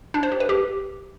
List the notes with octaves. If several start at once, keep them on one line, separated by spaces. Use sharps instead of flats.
D4
C5
G4
B4
G4